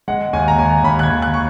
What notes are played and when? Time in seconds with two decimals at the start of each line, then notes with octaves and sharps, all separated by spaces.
0.08 G#3 F#5
0.33 D#2 G#5
0.48 A#5
0.59 D#2 G#5
0.84 D#2 B5
0.99 F#6
1.03 G#6
1.10 D#2
1.22 F#6
1.34 C#6